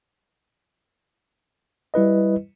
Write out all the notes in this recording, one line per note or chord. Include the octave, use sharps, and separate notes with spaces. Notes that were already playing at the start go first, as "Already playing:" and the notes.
G3 E4 B4 D#5